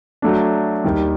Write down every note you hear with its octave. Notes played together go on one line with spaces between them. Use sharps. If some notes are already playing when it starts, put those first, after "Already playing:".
F#3 A3 D4
D#2 D#3 G3